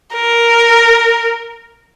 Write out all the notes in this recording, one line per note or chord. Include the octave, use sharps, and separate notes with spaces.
A#4